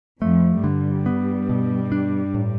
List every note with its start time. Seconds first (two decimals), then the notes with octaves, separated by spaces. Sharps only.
0.21 F2 F3 A3
0.63 G2 D3 G3
1.06 B3
1.49 B2
1.92 D4
2.34 A2